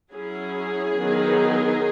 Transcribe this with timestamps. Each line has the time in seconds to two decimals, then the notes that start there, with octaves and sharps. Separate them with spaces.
0.12 F#3 C#4 E4 G#4
0.97 D#3 F#3 B3 D#4